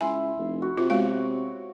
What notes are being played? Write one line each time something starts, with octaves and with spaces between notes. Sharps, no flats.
C#2 E4 G#5 C6
F1
F#4
C3 F4
G#3 B3 F#4 C#5 F5